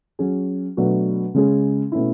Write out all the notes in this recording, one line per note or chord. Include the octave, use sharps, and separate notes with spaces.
F#3 C#4 G#4
B2 F#3 A3 D4 F#4
C#3 G#3 C#4 G#4
B2 A3 C#4 E4